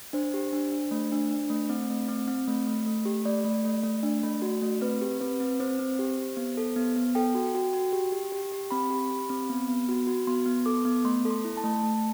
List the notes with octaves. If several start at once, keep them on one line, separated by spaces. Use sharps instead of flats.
D4 C5
G4
D4
D4
A3
D4
D4
A3
C4
A3
C4
C4
A3
A3
A3
G4
A3 D5
A3
A3
A3
D4
A3
F#4
A3
C4 B4
G4
C4 B4
C4
C4 C5
C4
G4
G4
B3
A4
B3
B3
A4 G5
F#4
F#4
F#4
G4
G4
G4
G4
C4 B5
G4
G4
C4
B3
B3
F#4
F#4
B3 C6
B3
A4 D6
B3
A3 C6
A4
C6
E4
A5
A3
A3